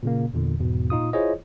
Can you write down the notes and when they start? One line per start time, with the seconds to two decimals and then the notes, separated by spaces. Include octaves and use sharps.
0.03 A#2 C#3 A#3
0.34 E2 A#2 D3
0.59 E2 G#2 B2
0.90 A#2 D#4 F4 D#6
1.13 E4 F4 G#4 C5 C#5 D#5